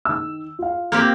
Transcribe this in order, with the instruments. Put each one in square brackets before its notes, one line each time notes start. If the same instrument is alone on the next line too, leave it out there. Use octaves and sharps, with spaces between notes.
[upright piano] D#3 E6
F4 F5
[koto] A#3 C4 G4